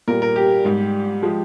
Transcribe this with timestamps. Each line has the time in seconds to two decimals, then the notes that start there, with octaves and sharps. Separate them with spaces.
0.08 A#2 G3 A#4
0.22 A#4
0.36 G4
0.65 G#2 G3
1.22 F3 G#3